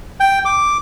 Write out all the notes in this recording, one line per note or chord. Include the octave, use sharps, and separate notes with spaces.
G5
D6